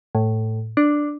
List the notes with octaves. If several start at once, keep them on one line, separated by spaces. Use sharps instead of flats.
A2
D4